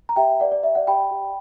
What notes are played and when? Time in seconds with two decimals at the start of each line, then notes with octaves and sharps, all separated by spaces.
0.09 A#5
0.16 G4 E5 G5
0.40 B4 D5 F#5
0.52 D5
0.63 G4 E5
0.75 D5 F#5
0.87 G4 G5 B5
1.11 G4